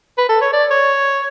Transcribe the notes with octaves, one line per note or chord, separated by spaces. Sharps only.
B4
A4
C#5
D5
C#5